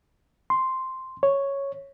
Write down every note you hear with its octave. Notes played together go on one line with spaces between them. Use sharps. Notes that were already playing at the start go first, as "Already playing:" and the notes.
C6
C#5